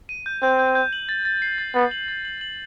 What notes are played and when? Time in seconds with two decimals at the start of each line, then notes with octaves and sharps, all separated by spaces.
0.09 D#7
0.26 G6
0.42 C4 G6
0.59 G6
0.75 G6
0.93 F#7
1.09 A6
1.25 A6
1.42 C7
1.58 A6
1.75 B3 A6
1.91 F#7
2.08 A6
2.25 F#7
2.41 F#7